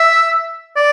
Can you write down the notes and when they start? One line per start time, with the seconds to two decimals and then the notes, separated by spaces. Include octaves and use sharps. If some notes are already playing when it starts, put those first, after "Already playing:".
Already playing: E5
0.76 D5